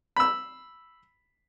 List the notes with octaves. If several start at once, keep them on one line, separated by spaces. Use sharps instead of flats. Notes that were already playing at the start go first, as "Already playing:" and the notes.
B5 E6